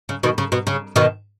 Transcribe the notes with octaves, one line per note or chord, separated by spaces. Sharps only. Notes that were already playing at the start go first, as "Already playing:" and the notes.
C#3
B2 D#3
C#3
B2
C#3
B2 D#3